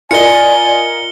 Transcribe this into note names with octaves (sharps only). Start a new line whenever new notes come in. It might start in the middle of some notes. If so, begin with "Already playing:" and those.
F4 A#4 D5 D#5 G#5 C#7 G7